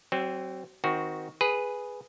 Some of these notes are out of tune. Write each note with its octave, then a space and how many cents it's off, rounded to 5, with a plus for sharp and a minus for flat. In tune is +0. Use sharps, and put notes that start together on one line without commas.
F#3 +35 C4 +5
D#3 +20 C4 +0 F#4 +0
G#4 +0 B4 +0